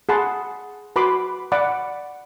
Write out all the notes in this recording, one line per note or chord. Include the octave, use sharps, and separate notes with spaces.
G#4 F#5 A5 B5 C6
F#4 B4 B5 C6 D6
D5 F#5 B5 D6